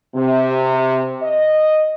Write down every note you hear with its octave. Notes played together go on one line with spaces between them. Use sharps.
C3
D#5